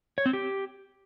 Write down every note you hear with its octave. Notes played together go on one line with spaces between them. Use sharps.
C#5
C4
G4